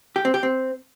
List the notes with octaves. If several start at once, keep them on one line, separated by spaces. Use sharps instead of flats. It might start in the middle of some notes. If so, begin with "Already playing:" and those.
G4
C4
G4
C4